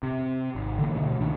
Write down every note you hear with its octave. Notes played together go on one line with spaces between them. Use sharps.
C3
G#1
D3 E3 A#3
D2 B2
C#2 B2 D#3 D4